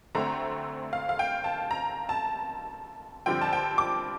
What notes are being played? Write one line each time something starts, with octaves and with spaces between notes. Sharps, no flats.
D2 D3 A3 C4 A#5
F5
F5
G5
A5
A#5
A5
G2 D3 F3 C4 G5
A5
G5
D6